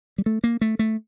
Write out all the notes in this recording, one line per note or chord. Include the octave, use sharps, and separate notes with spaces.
G3
A3
A#3
A3
A3